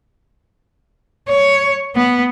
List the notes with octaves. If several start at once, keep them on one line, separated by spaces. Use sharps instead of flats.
C#5
B3